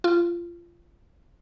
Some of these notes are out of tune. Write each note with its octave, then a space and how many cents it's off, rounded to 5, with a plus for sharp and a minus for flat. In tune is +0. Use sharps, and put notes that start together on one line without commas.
F4 -20